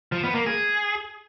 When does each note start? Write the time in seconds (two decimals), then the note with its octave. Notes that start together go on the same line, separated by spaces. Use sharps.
0.12 F3
0.24 B3
0.35 A#3
0.46 G#4